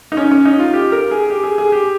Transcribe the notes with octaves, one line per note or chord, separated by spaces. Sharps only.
D#4
C#4
C#4
D#4
F4
G4
A#4
G#4
G4
G#4
G#4
G4